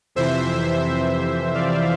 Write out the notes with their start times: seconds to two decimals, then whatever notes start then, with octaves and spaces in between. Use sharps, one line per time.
0.15 F2 C3 E3 C5 E5
1.55 D5 F5